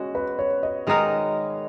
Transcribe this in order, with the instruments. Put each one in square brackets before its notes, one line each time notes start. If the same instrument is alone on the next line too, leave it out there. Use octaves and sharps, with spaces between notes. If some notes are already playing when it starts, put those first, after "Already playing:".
Already playing: [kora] G#3 C#4 [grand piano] F#4
[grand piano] B4
C#5
D#5
[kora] D#3 G#3 D#4 A#4